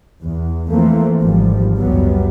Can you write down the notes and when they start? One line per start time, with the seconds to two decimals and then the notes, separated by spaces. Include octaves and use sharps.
0.21 E2
0.69 E3 F3 A3 A#3 C4
1.22 G#1 F3 G3
1.78 C#2 F#2 F#3 G3 B3